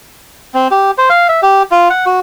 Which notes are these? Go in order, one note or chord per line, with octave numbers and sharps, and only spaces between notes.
C4
G4
C5
F5
E5
G4
F4
F#5
F#4